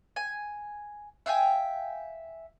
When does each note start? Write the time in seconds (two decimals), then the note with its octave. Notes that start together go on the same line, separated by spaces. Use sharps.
0.16 G#5
1.26 E5 F5 G5 G#5